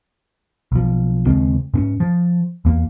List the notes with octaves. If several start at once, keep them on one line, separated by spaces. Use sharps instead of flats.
B1 F3
D#2 C#3 G#3 C4
G#2 C4 C#4
F3
E2 A#3